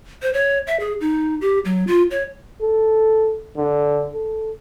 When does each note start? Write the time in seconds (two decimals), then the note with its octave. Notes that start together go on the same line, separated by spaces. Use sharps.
0.22 C5
0.33 C#5
0.67 E5
0.80 G#4
1.01 D#4
1.41 G4
1.65 F#3
1.87 F4
2.11 C#5
2.62 A4
3.57 D3
4.14 A4